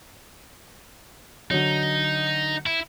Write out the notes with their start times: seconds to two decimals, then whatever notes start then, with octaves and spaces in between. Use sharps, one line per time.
1.51 D3 F#3 D#4
2.66 E4